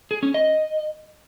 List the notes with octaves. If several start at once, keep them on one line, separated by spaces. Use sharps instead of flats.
G#4
C#4
D#5